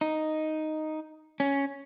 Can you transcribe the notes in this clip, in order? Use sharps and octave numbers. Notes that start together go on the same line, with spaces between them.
D#4
C#4